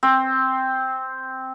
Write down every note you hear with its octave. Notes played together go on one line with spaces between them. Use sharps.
C4